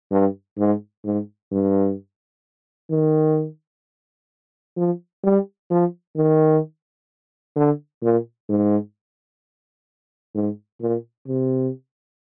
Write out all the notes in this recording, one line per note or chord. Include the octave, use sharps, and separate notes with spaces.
G2
G#2
G#2
G2
D#3
F3
G3
F3
D#3
D3
A#2
G#2
G#2
A#2
C3